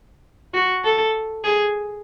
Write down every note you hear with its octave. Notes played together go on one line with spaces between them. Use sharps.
F#4
A4
G#4